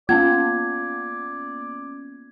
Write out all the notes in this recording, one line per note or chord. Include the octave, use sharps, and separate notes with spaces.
A#3 B3 C#4 F4 D5 G#6